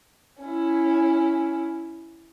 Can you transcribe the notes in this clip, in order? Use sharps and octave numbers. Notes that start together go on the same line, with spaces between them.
C#4 E4